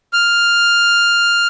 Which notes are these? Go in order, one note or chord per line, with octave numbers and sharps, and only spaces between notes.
F6